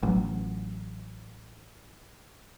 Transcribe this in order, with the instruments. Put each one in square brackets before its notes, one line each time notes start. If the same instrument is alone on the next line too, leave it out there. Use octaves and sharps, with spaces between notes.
[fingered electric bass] A1 F#3